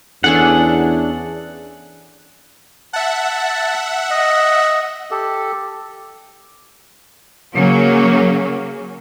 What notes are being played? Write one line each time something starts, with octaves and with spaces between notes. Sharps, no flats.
E2 C#4 D4 G#4 A4 F#5
E5 F#5 A5
D#5
G4 A4
C#3 F#3 A#3 C#4